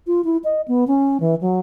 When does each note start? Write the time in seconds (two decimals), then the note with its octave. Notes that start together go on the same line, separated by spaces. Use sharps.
0.07 F4
0.25 E4
0.44 D#5
0.68 B3
0.87 C#4
1.20 E3
1.41 F#3